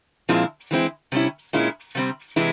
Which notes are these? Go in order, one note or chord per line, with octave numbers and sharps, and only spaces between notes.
A#2 F3 G#3 C4 E4
E3 G#3 C4 E4
C3 G3 C#4 E4
A#2 G#3 C#4 E4
C3 G3 C4
C3 E3 G#3 E4